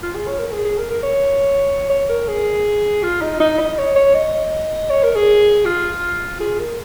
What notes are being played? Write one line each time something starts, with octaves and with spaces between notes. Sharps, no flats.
F4
G#4
C#5
A#4
G#4
G#4
A#4
A#4
C#5
C#5
A#4
G#4
F4
D#4
D#4
D#5
C#5
C#5
D#5
C#5
A#4
G#4
F4
G#4
A#4